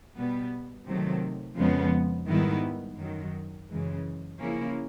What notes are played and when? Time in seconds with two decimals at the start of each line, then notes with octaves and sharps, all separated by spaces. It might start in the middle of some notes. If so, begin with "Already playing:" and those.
0.16 B2 G3 B3
0.87 C3 D#3 F#3 A3
1.57 F2 C#3 F3 G#3 B3
2.28 G#2 D#3 G3 B3 E4
2.99 F#2 D#3 F#3
3.70 F#2 C#3 E3 G#3
4.40 C#3 F3 A#3 C#4 E4